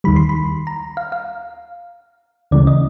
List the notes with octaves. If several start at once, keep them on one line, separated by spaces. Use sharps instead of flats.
D#2 D#3 G3 B5
C6
B5
A#5
F5
F5
D2 C#3 E3 G#3 D5
D#5